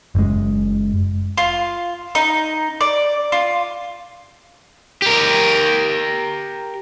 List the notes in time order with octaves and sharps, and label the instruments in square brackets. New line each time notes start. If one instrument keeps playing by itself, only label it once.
[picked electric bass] F#1 G#3
[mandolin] F4
D#4
D5
F4
[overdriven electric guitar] G4 A#4